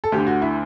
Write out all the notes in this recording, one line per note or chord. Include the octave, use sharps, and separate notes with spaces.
A4
D2 D3 G4
F#4
E4